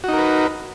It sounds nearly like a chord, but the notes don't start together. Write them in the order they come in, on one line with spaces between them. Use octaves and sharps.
F#4 D#4 A#4 B4